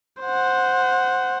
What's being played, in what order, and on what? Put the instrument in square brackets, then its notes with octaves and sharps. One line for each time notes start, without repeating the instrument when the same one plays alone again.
[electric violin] C5 F#5